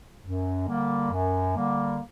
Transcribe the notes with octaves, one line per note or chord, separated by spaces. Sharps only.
F#2
D3 G3 A#3
F#2
D3 G3 A#3